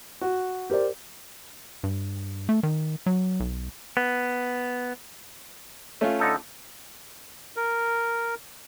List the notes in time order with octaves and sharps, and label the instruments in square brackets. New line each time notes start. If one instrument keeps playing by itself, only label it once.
[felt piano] F#4
G4 A#4 C5 D5
[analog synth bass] G2
A3
D#3
F#3
B1
[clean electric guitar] B3
[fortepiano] A3 C#4 F4
[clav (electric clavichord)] D3 D#4 A4
[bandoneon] A#4